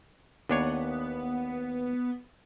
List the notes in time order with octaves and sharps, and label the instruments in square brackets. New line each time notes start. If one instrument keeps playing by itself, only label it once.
[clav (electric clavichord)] D#2 D4 C#5 [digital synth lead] B3